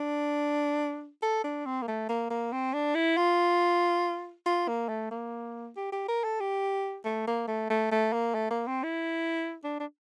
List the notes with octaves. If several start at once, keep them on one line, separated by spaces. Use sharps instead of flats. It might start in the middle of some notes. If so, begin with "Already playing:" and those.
Already playing: D4
A4
D4
C4
A#3
A3
A#3
A#3
C4
D4
E4
F4
F4
A#3
A3
A#3
G4
G4
A#4
A4
G4
A3
A#3
A3
A3
A3
A#3
A3
A#3
C4
E4
D4
D4